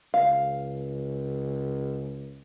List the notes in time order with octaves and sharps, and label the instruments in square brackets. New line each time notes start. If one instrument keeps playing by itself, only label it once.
[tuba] C#2 [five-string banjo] F5